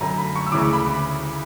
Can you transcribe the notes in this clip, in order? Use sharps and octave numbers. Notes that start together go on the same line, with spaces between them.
F#2 D3 A#5
B5
C#6
E6
D2 C#3 E3 D6
B5